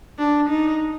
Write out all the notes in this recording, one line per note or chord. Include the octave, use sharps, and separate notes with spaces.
D4
D#4